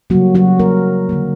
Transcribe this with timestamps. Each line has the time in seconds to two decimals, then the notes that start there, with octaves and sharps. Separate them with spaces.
0.10 C#3 F#3 G3 A#3 F#4
0.35 F#3 F#4
0.60 A#3 A#4
1.09 D3 A#3